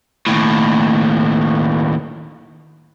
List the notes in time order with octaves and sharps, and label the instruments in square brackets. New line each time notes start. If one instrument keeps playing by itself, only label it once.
[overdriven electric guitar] D#2 A2